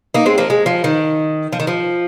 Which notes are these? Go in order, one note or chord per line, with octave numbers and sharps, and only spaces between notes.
A#3 D#4
G#3 C4
F3 A#3
G#3
F3
D#3
F3
D#3
F3